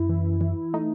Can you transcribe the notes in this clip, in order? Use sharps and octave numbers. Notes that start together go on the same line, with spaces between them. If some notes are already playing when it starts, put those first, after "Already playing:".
Already playing: F#2 E4
E3
E3
A3 D#4